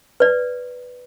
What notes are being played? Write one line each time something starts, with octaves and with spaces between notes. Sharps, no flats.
B4 D5